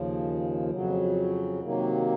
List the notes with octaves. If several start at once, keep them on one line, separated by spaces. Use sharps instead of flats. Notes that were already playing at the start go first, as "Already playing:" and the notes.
Already playing: D#2 C#3 F3
F2 C#3 F#3
C3 D#3 F#3 A#3